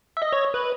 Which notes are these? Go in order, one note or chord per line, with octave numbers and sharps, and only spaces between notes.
E5
D#5
C#5
B4